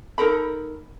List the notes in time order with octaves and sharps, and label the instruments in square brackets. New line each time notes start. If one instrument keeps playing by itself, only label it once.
[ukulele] D#4 A4 A#4 B5